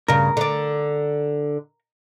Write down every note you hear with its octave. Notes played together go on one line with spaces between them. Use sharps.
G2 C#3 A#4
D3 D5